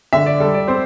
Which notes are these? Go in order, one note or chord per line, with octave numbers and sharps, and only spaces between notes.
D3 E5
D5
G3 A4
D5
C4 C5